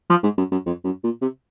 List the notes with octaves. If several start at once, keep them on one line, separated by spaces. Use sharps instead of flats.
F3
G#2
F#2
F#2
F2
F#2
A#2
C3